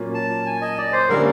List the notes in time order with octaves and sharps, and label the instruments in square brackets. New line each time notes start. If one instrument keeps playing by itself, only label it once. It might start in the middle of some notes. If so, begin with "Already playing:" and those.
Already playing: [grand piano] A#2 F#3 A#3 C#4 F4
[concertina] A5
G#5
D#5
D5
C5
[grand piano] D3 G3 A#3 C#4 [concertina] A#4